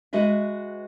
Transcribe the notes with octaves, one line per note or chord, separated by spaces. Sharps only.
G#3 F#4 B4 D#5 E5